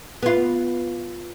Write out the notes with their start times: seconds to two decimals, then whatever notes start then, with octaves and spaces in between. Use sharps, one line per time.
0.23 B3 F4